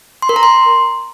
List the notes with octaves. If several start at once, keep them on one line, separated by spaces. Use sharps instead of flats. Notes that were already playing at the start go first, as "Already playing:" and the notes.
C6
A#4
A#5
C6